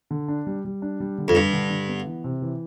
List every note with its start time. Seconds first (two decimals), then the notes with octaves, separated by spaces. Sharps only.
0.11 D3
0.28 D4
0.47 G3
0.65 G3
0.82 D4
1.00 G3
1.18 D3
1.28 F2
1.35 G2 D4
1.53 D3
1.70 D3
1.88 B3
2.07 E3
2.24 C3
2.42 E3